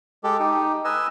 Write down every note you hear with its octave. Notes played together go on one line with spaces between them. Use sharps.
G#3 G4 A4
D#4 G4
B4 D#5 G#5 E6